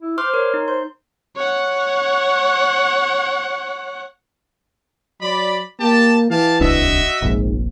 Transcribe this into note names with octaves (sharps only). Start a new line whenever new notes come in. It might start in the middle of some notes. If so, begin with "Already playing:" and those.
E4
C5 C6 D6 F6
A#4 C#5 C6
D#4
C5 C6
C#5 F#5
F#3 D5 B5
A#3 G4 A5
E3 G4 F5 A5
D1 C2 D4 F#4 D#5 E5
F1 A#1 G#2